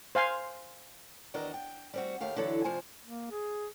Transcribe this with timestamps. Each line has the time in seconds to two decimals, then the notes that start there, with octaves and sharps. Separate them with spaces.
0.15 C5 F5 G#5 C6
1.34 E2 D#3 D4 F#4 D#5 A#5
1.54 G5
1.94 G3 C4 F#4
2.21 D#2 A3 G4 F5
2.36 D3 E3 F#3 E4 A4
2.64 D2 C3 F3 C5 G#5
3.05 A#3
3.31 G#4